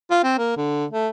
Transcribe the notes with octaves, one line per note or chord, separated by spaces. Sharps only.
F4
C4
A#3
D3
A3